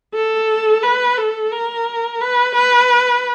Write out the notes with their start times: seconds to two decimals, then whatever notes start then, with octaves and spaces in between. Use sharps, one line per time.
0.14 A4
0.83 B4
1.17 A4
1.51 A#4
2.21 B4
2.55 B4